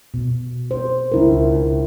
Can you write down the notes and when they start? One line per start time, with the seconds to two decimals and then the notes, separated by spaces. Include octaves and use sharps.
0.14 B2
0.71 C5
1.12 C#2 D4 E4 A#4